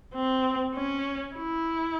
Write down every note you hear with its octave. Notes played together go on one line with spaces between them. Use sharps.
C4
C#4
E4